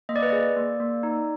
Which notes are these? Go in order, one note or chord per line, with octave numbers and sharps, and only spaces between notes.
A#3 D#5
D5
B4
G#4 D5
A#3
A#3
D#4